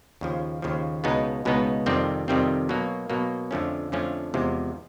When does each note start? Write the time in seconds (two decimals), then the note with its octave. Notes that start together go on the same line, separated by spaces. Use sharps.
0.21 D#2 C#3 F3
0.62 D#2 C#3 F3
1.04 C#2 B2 G#3 B3 D#4
1.45 C#2 B2 G#3 B3 D#4
1.86 F2 C3 D#3 G3 C4
2.28 F2 C3 D#3 G3 C4
2.69 B2 F#3 A#3
3.10 B2 F#3 A#3
3.51 F2 D3 F3 A3 C#4
3.92 F2 D3 F3 A3 C#4
4.34 E2 C3 F3 G#3